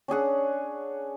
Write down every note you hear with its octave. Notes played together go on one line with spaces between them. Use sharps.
C#4 D4 G#4 F#5